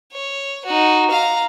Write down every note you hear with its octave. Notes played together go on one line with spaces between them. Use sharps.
C#5
D#4 F#4
F5 A#5